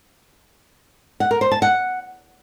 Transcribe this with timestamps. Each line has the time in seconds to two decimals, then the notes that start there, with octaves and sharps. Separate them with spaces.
1.20 F#5
1.31 A#4
1.41 C5
1.52 A5
1.62 F#5